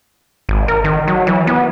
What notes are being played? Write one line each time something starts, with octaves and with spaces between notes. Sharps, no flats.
G#1
A#4
D#3
F#3
E3
B3